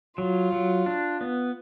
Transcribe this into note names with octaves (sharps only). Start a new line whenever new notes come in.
F#3 F4
F#3
D4
B3